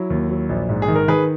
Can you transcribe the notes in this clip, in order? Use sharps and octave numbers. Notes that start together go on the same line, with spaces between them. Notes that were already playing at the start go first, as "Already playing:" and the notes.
Already playing: F#3 E4
D#2
F#3
A#1
G#2
G#4
D#3
A#4
D#3 G#4 B4